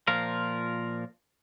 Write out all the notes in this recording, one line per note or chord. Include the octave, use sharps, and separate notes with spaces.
A#2 F3 F4 A#4